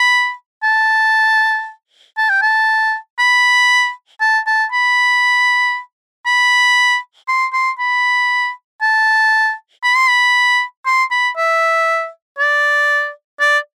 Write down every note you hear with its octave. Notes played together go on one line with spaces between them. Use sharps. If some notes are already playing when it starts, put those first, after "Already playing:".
Already playing: B5
A5
A5
G5
A5
B5
A5
A5
B5
B5
C6
C6
B5
A5
B5
C6
B5
C6
B5
E5
D5
D5